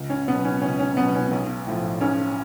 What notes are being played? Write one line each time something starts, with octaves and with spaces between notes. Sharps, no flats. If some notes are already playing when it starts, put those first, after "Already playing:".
Already playing: C#2
C#4
B2 F#3 B3
C#4
C#2 C#4
C#4
B2 F#3 B3
C#4
B1
A2 F3
B1 C#4